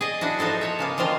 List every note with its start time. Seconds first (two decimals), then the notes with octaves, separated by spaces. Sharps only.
0.01 G#4 D5 D#5
0.21 D4 E4 F#4
0.39 F3 D#4 F#4 A4 C5
0.61 A4 C#5 E5
0.79 C#3 A#3 B3
0.97 D3 D#3 F3 C4 F4 C5